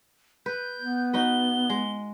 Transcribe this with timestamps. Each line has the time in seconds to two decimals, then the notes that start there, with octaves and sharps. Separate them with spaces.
0.46 B4 G6
0.79 B3
1.13 D#4 F#4 B4 G7
1.70 G#3